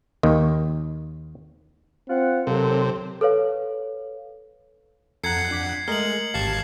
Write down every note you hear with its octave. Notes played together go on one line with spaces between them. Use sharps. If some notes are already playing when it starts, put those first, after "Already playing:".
D#2 D#3
C4 F4 F#5
D#2 C3 F#3 A4
A4 B4 C#5 F5
F2 A4 F#5 A#5 G#6 C7 C#7
D4 D6 B6
G#3 A3 A#4 D#5 F6 F#7
G#1 G4 F5 A5 G#6 C7